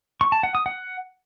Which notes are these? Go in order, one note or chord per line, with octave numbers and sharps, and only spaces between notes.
C#6
A5
F#5
D#6
F#5